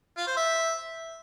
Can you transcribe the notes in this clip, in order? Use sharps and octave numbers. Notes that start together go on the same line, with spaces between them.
F4
C5
E5